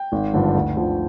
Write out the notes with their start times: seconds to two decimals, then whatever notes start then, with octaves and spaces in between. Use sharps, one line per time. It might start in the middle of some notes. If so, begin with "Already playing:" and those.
Already playing: G5
0.12 G#1
0.33 G2 D3 F3
0.55 D2
0.77 D3 F3